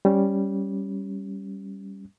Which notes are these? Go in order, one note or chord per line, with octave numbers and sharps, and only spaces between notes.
G3 C#4